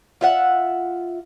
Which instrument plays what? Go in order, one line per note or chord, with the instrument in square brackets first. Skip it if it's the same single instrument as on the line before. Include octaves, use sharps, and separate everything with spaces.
[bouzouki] F4 E5 F#5